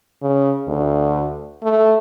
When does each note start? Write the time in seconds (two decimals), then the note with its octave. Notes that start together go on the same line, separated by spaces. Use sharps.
0.22 C#3
0.68 D2
1.63 A3